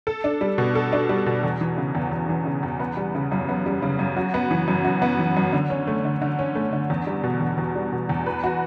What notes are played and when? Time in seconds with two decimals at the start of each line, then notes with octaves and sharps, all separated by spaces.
0.07 A4
0.24 D4
0.41 G3
0.58 B2
0.75 A4
0.93 D4
1.09 G3
1.26 B2
1.43 E2
1.61 E3
1.77 C#3
1.95 E2
2.12 E2
2.29 E3
2.45 C#3
2.63 E2
2.80 B3
2.97 G3
3.15 C#3
3.32 F#2
3.49 B3
3.66 G3
3.82 C#3
3.99 F#2
4.16 F#4
4.34 B3
4.51 E3
4.68 F#2
4.85 F#4
5.02 B3
5.19 E3
5.37 F#2
5.53 D3
5.70 C#4
5.87 A3
6.05 D3
6.22 D3
6.39 C#4
6.55 A3
6.73 D3
6.90 E2
7.07 G3
7.24 B2
7.41 E2
7.58 E2
7.76 G3
7.92 B2
8.09 E2
8.26 B4
8.44 F#4